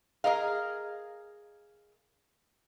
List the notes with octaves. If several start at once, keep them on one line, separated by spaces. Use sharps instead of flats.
G#4 A#4 D#5 F5